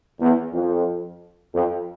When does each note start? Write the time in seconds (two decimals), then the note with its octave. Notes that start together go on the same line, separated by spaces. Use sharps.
0.20 E2
0.53 F2
1.53 F2